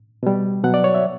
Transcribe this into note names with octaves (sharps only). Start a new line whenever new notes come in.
B2 G3
B2 F#3 F#5
D5
C#5
E5